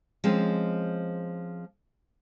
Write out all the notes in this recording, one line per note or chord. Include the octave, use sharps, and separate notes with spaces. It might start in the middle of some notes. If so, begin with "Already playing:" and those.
F3 G#3 C4 C#4